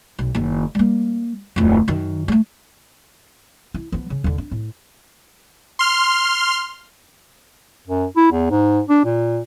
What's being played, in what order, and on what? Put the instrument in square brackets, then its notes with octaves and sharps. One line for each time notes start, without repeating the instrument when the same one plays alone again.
[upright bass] B1
F#1 D#3
G3 A#3
D1 F2
F#2 D#3
G3 A3
E4
F3 B3
C#3
D#2 D3
D4
A2
[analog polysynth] C6 F6
[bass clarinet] F#2
E4
E2
G#2
D4
A#2